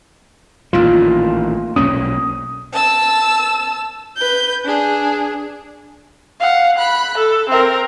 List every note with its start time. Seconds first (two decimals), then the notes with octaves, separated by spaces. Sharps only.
0.73 A1 A#2 D#3 F4
1.76 B1 A#2 C#4 D#6
2.73 A5 E6
4.16 B4 G6
4.65 D4 G#4
6.40 F5 F#5
6.77 B5 F#6
7.17 A4
7.49 C4 A#4